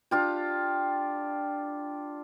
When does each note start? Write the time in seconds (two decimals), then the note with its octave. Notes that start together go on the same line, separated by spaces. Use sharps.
0.11 D4 F4 G4